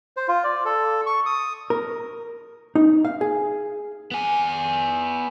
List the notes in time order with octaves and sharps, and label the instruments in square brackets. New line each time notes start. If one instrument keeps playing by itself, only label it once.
[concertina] C5
F4
D5
A4
C#6
D#6
[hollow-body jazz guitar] A#4
D#4
F5
G#4
[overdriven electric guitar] B3 G#5